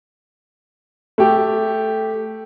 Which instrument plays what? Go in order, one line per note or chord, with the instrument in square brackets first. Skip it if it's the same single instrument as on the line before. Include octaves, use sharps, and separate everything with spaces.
[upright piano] A3 G4